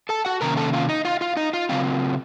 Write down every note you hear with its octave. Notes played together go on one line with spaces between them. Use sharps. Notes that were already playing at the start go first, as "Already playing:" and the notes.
A4 A5
F#4 F#5
C3 D#3 A#3 C#4 A#4 A#5
A4 A5
F4 F5
D#4 D#5
F4 F5
F4 F5
D#4 D#5
F4 F5
C#3 F#3 C4 F4 F5